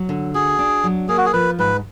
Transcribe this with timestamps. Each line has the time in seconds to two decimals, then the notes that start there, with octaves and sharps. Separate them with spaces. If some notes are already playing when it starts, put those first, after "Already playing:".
Already playing: F#3
0.09 D3
0.34 F#4 G#4
0.59 D4
0.84 F#3
1.09 A#3 G#4
1.18 F#4
1.26 G#4
1.33 F3 B4
1.59 G#2 B4